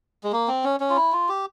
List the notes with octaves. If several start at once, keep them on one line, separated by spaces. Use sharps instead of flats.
G#3
A#3
C4
C#4
C#4
F4
E4
F4
G4